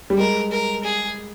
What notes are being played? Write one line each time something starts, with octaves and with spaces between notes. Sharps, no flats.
G3
G#3 A#4
A#4
G#4